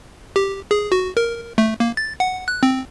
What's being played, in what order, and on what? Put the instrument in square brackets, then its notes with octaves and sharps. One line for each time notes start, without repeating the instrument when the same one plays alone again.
[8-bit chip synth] G4
G#4
F#4
A#4
A3
A#3
A6
F#5
F#6
C4